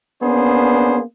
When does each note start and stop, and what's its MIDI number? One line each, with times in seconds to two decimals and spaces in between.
0.23 1.00 58
0.23 1.00 59
0.23 1.00 61
0.23 1.00 62
0.23 1.00 68
0.23 1.00 72